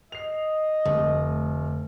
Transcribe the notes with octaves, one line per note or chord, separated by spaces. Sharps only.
D#5 C7 F7
F1 D3 A3